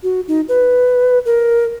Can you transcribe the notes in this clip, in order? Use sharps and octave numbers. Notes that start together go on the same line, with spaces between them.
F#4
D#4
B4
A#4